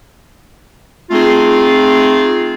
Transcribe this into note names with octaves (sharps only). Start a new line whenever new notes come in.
A3 C4 D#4 F4 G#4